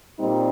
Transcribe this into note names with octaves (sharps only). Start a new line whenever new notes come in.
A#2 G3 C4 D#4